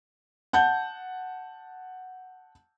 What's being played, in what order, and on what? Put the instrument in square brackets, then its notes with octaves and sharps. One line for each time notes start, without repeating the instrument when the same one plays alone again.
[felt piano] F#5 A5 G6